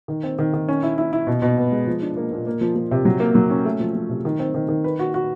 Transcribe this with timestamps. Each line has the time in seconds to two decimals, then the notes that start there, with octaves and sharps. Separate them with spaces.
0.08 D#3
0.23 C4
0.39 D#3
0.54 D#3
0.68 C#4
0.83 E4
0.98 E4
1.13 E4
1.27 B2
1.42 B2
1.58 B3
1.72 G#3
1.87 F3
2.02 D4
2.17 A#3
2.32 A#2
2.47 A#3
2.61 F3
2.76 F3
2.91 C3
3.05 F#3
3.20 A#3
3.35 F#3
3.50 C#4
3.65 A3
3.80 F3
3.95 F3
4.09 C3
4.25 D#3
4.39 C4
4.54 D#3
4.69 D#3
4.84 B4
4.99 F#4
5.14 F#4